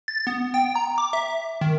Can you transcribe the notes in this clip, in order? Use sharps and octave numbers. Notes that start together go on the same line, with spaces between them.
A6
B3
G5
A#5
D6
E5
D#3